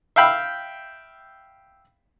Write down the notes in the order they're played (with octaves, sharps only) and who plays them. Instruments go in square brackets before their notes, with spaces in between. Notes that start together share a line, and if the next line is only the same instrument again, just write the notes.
[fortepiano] E5 F5 G5 B5 E6